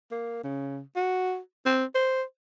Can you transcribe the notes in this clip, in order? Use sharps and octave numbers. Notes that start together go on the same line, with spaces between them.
A#3
C#3
F#4
C4
C5